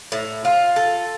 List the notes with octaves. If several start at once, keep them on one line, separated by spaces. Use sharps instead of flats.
A2
F4
A4